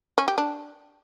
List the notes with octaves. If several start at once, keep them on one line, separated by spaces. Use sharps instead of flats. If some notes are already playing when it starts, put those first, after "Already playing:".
C#4
G4
D4